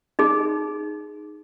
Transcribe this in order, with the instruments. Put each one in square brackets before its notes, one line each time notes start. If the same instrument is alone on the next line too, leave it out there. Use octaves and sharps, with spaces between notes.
[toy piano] D#4 G#4